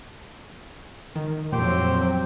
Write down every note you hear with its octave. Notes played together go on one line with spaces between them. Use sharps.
D#3
F2 A#2 F#3 C4 G4 C5 G5